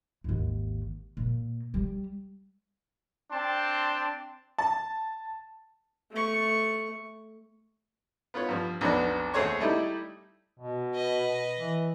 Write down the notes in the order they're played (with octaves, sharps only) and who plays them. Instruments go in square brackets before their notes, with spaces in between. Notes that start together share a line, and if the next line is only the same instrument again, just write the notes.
[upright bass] G#1 D#2
A#2
G3
[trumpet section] C4 D4 G5 A5 C6
[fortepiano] A5
[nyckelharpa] A3 C#6
[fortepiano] B3 F4 B4 C#5
G2 F3
B1 F2 B3 D4 B4
D#2 A3 C4 G#4 C#5 C#6
G3 A3 D#4 E4
[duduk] B2
[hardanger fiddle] B4 D#5
[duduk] E3